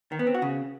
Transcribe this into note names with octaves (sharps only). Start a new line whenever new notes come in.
D#3
B3
C4
F#4
C#3